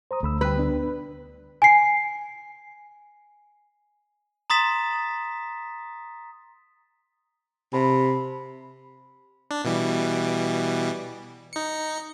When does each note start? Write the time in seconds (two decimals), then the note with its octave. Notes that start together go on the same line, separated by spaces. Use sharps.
0.11 C5 A#5 D#6
0.23 D2 A3 B5 E6
0.41 G3 B4 G5
0.57 B3 D4
1.62 G#5 C7
4.50 A#5 C6 D#6 A6 B6 E7
7.73 C3 A5 B5
9.51 D4
9.65 B2 E3 G3
11.53 D#4 C#7